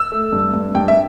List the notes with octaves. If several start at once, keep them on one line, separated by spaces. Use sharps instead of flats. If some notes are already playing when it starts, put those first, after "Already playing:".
Already playing: E6
A3
G2
G2
G2 G5
E5